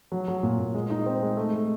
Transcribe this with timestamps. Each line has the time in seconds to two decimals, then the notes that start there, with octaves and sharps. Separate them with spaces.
0.12 F#3
0.28 F#3
0.43 A#2
0.59 A#2
0.74 G#3
0.90 D#4
1.06 C4
1.22 G#3
1.37 A3
1.53 A3